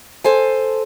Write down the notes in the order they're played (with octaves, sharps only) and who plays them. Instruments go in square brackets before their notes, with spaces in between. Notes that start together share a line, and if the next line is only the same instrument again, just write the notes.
[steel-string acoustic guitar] A4 C5 G#5